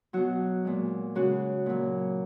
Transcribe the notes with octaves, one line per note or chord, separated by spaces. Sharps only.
B2 F#3 F#4
A#2 G#3
C#3 G#3 F#4
A#2 F#3